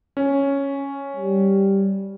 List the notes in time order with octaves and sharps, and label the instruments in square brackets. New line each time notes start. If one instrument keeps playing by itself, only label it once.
[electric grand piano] C#4
[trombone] G3